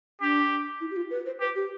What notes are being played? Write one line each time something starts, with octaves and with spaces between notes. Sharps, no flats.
D4 G4
E4
G4
F4
B4
C5
G4 B4
G4